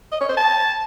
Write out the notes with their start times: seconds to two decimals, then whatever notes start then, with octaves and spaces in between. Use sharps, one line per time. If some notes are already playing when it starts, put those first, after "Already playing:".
0.12 D#5
0.20 C#5
0.29 C5
0.37 A5